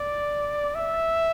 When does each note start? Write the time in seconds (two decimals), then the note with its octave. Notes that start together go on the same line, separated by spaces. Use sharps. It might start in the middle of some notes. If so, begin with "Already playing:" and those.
Already playing: D5
0.75 E5